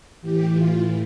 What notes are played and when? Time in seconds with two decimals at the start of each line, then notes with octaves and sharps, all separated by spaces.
0.21 A2 E3 G4
0.53 F4